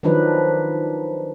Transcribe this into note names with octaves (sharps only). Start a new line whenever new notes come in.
D#3 F3 F#3 D4 D#4 B4